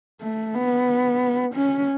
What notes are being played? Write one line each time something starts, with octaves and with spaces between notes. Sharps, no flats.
A3
B3
C#4